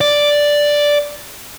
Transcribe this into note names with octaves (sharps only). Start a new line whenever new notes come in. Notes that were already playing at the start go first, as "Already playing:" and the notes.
D5